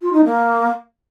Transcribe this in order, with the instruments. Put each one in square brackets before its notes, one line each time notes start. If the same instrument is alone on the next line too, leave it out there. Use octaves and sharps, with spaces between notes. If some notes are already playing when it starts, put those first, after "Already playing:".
[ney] F4
D#4
A#3